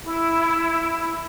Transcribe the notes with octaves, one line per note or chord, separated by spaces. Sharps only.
E4